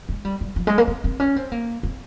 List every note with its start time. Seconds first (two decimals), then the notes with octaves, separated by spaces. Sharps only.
0.09 G#3
0.25 G3
0.41 G3
0.56 F3
0.67 G#3
0.78 A#3
0.88 C4
1.04 C4
1.20 C#4
1.36 C4
1.52 A#3
1.83 C4